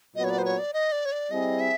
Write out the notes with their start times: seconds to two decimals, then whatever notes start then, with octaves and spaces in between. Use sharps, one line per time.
0.15 A#2 F#3 B3 D#5
0.24 C#5
0.30 D5
0.38 C5
0.45 C#5
0.58 D5
0.73 D#5
0.92 D5
1.05 C#5
1.12 D5
1.31 G3 C4 E4 G#4 D#5
1.60 E5